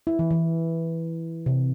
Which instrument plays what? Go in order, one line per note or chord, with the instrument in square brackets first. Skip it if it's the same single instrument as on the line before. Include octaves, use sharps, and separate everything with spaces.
[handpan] E4
E3
E3
C3